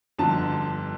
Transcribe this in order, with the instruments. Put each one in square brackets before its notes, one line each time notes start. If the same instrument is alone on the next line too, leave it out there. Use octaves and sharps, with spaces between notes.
[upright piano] G1 F2 D3 A5